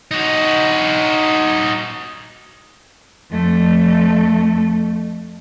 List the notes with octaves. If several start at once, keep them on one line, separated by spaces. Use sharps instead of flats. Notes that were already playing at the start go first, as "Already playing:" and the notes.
D#4 F#4
F2 A3